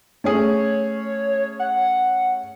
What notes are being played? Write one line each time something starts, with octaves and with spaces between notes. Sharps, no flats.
A3 C#4 G#4 C#5
F#5